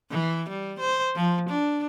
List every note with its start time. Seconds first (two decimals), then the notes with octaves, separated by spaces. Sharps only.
0.11 E3
0.49 G3
0.80 C5
1.16 F3
1.49 D4